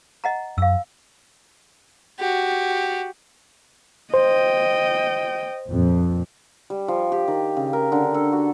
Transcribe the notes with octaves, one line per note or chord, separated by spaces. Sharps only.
D#5 F#5 A#5
F#2 F5 E6
F#4 G4
C5 D#5 G5
F2 A#2
G3
F3
G4
D#3
C#3
A#4
D3
A4
F#4